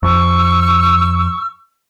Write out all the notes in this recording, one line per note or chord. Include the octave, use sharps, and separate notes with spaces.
F2 C#6 E6